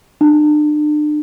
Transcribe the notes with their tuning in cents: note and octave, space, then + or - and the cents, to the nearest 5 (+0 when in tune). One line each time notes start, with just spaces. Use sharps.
D4 +35